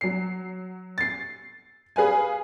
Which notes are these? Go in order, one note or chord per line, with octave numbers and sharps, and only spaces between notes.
F#3 C7
A6 C7
G#4 B4 F5 G#5